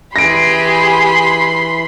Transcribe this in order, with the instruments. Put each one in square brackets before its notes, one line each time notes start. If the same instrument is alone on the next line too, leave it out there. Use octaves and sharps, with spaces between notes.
[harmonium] E3 [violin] G4 G#4 [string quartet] B5 C6 [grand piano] A#6 D7